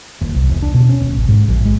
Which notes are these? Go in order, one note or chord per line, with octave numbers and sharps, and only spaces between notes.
D#1
C2
E1
D4
B2
C#4
D#1
A1
G#2
A#1
G#3